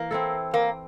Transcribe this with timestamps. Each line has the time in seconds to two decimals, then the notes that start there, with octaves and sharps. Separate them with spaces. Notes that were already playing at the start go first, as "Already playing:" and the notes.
Already playing: E3 A#3
0.11 C4 E4 A4
0.54 A#3